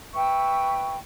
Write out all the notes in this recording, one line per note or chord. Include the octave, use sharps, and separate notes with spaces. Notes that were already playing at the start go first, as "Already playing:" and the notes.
B4 E5 G5 C#6